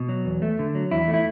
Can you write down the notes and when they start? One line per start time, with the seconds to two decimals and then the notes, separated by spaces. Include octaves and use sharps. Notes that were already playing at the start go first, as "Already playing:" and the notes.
Already playing: B2
0.09 F#3
0.25 E2
0.42 A3
0.59 D3
0.75 F#3
0.91 E2 E4
1.08 A3
1.14 E4